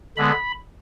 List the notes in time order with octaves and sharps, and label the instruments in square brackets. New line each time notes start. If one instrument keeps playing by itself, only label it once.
[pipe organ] D3 G#3 B3 B5